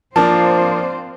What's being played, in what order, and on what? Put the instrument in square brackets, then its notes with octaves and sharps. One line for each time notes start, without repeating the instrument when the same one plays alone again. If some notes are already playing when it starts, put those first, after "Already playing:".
[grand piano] F3 A#3 D4 [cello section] C4 F4 C5 [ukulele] A5